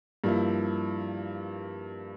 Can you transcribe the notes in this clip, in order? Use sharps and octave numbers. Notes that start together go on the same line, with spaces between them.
G2 F3 A#3 E4